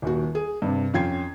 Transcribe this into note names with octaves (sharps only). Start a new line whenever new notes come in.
D#1 D#2 F#4
G#4
G2 C3
F2 C#4 F4 G5 G#6 C7